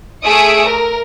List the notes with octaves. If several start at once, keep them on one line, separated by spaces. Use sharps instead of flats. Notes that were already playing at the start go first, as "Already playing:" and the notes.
A3 G#4 E5 D#6 C#7 D7
A#4